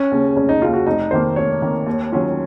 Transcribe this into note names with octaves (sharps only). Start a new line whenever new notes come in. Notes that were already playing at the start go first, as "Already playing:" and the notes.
Already playing: C#4
D#2 C#3
F1 C#4
D#4
D#2 C#3 F4
F#4
F1 D#4
F2 D#3 A#3 C5
F1 C#5
F2 D#3 A#3
D#2
D#3 F#3 C#4 F4